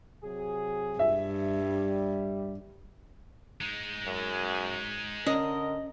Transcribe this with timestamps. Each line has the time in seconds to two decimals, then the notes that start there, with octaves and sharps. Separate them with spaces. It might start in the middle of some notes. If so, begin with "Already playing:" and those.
0.22 C3 F#3 G#4
0.99 G2 E5
1.60 G3
3.61 G#3 D#4
4.05 F#2
5.26 D3 C#4 A#4 D#5